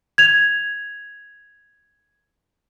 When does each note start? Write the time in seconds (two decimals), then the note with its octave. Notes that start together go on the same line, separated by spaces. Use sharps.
0.18 G#6 F7